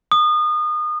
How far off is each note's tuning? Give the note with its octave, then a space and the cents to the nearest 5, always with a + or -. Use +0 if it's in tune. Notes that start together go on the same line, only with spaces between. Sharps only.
D#6 -30